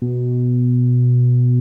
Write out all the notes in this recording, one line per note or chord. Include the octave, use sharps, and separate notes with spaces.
B2